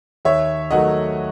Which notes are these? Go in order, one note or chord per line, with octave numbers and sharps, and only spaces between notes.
D#2 C#5 E5
D#3 F#3 A3 D#5 F#5